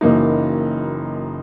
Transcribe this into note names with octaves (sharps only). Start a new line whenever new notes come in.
F#1 F#2 E3 A#3 D#4